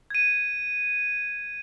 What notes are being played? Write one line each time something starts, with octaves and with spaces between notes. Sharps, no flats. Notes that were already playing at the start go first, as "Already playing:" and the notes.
G#6 D#7